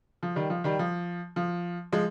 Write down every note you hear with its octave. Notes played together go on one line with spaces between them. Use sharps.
F3
D#3 G3
F3
D#3 G3
F3
F3
F3 G#3